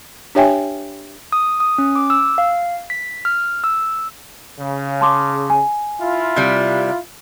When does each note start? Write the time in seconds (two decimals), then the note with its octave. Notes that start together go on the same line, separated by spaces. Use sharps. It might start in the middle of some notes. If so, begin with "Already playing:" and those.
0.35 D4 G4 C#5 E5 G5 G#5
1.32 D#6
1.60 D#6
1.78 C#4
1.96 D6
2.10 E6
2.38 F5
2.90 B6
3.25 F6
3.64 E6
4.59 C#3
5.01 A5 C6 D6
5.50 G#5
6.01 E4 F4
6.36 C3 G3